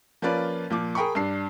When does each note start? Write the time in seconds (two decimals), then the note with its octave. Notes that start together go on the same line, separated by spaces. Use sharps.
0.22 F3 A#3 C#4 F4 B4 D5
0.70 A#2 F3 D6
0.95 G#4 A#4 G5 B5 C#6
1.15 G2 D4 C7